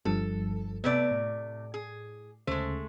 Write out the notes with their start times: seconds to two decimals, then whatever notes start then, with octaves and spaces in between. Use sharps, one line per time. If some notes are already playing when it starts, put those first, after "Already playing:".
0.05 G1 G2 F3 A4
0.84 C3 A3 B3 B4 D5 A5
1.11 A2
1.74 G#4
2.47 D2 C#3 G#3 A3 C5